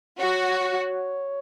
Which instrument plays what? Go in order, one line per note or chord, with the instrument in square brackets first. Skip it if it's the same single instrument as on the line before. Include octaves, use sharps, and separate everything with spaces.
[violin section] F#4 [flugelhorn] C#5